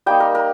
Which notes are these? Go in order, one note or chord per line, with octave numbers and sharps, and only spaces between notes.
G3 A#3 D#4 G5
A#4
A#4